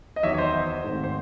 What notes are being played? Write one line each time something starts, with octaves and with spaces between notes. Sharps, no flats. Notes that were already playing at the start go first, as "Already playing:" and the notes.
D#5
E2 D#3 F#3 C#5 E5
C#5
C5 D#5
G#1 G#2 D#3 A3
C5